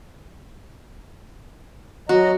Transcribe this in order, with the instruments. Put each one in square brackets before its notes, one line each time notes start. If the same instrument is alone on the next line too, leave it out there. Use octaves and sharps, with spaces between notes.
[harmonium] F#3 D#5 A#5 [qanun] F#4